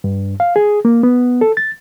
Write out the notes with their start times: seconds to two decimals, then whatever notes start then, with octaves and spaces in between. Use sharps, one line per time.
0.04 G2
0.40 F5
0.56 G#4
0.85 A#3
1.03 B3
1.41 A4
1.57 A6